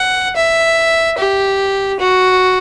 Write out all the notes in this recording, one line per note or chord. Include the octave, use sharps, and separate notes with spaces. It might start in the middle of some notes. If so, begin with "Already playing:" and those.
Already playing: F#5
E5
G4
F#4